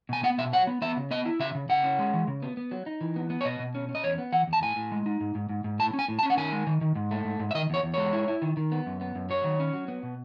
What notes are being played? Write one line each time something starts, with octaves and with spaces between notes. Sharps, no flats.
B2 G#5
B3 F#5
B2 E5
F#3 F#5
B3
B3 E5
C#3
B3 D#5
E4
C#3 E5
C#3
C#3 F#5
C#4
G#3
E3
C#3
B3
B3
F#3
D#4
E3
B3
B3
C#5
B2 D#5
B2
C#4
C#4
D#5
E2 C#5
B3
E3 F#5
E2
A5
A2 G#5
A2
G#3
D#4
G#2
G#2
G#2
G#2
A2 A5
C#4
G#5
A2
A5
C#4
F#5
D#3 G#5
G#3
D#3
D#3
G#2
A3
G#2
G#2
E5
D#3 D#5
E2 C#5
E2
G#3 C#5
E4
E4
D#3
D#3
B3
F#2
B3
F#2
F#3 C#5
D#3
C#4
F#3
B3
B2